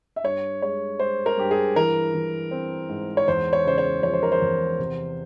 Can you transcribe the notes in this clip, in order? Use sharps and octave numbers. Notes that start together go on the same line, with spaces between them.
E5
G2 C#5
G#3 C#5
G#3 C5
A#4
G2 G4
G#4
E3 A#4
E3
C4
G#2
C#5
E2 C5
C#5
C#3 C5
C#5
F3 C#5
C5
A#4
C5
E2
C3